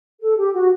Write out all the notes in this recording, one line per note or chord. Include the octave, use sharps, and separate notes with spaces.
A4
G4
F#4